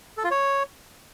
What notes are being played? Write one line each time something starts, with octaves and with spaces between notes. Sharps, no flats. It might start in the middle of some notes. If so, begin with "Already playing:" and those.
A4
F4
C#5